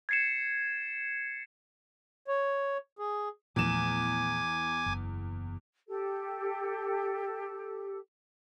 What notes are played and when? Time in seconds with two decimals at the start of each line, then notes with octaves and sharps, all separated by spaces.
0.09 G#6 A6 C7 C#7 E7
2.28 C#5
2.99 G#4
3.56 E2 A#2 F3 A3 G#5 D6 G#6 E7
4.86 F#1
5.88 G4 A4